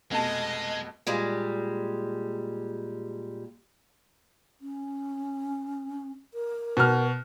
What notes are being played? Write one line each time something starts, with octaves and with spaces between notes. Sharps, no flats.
F1 B2 G#3 D#5 A5
A#2 G3 G#3
C#4
A#4
B2 F6